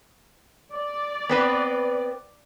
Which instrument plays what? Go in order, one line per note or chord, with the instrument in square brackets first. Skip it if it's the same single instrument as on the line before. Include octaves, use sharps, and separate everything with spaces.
[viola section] D5
[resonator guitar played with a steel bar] B3 C4 B4